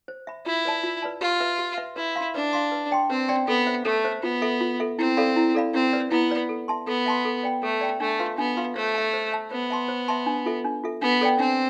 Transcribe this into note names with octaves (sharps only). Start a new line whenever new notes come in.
C5
E5 B5
E4 F4
B4 D5 A5
F4
B4 D5 A5
F4 G4
B4 E5
G4
B4 E5
E4 B4
F5 C6
D4 B4
F5 C6
B4
D5 G5 C6
C4 B4
D5 G5 C6
B3 A4
C5 E5
A3 A4
C5 E5
B3 F4
A4 E5
F4
A4 E5
C4 E4
A4 D5 F5 B5
E4
A4 D5 F5 B5
C4 E4
B4 D5
B3 E4
B4 D5
A4
E5 A5 C6
B3 A4
E5 A5 C6
A4
D5 G5 B5
A3 A4
D5 G5 B5
A3 D4
F4 B4 F5 C6
B3 D4
F4 B4 F5 C6
A3 C5
E5 A5
C5
E5 A5
B3 C5
E5 A5 C6
C5
E5 A5 C6
D4
F4 A4 E5
D4
F4 A4 E5
B3 D4
A4 D5 G5
C4 D4